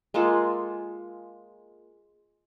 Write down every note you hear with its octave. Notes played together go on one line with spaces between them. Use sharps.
G#3 A#3 F4 A4